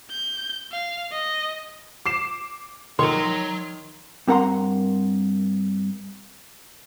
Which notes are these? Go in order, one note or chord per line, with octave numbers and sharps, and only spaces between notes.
G6
F5
D#5
D6 C7 E7
D#3 C#5 A#5 C6
G2 C4 A#4 F#5 A#5 C6